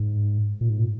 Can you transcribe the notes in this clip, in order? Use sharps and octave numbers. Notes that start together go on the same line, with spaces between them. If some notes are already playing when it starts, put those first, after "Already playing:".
Already playing: G#2
A#2
G#2
A#2